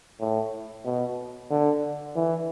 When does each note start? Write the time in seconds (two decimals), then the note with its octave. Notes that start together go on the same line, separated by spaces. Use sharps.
0.20 A2
0.85 B2
1.50 D3
2.16 E3